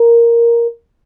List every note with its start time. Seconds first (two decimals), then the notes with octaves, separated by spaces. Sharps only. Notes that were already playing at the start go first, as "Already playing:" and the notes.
Already playing: A#4